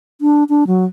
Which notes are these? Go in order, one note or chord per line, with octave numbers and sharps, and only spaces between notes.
D4
D4
F#3